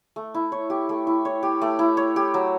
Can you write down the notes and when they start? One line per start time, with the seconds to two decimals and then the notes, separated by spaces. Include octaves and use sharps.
0.16 A3
0.34 E4
0.52 C#5
0.70 G4
0.89 A3
1.07 E4
1.25 C#5
1.43 G4
1.61 A3
1.79 E4
1.97 C#5
2.16 G4
2.34 F#3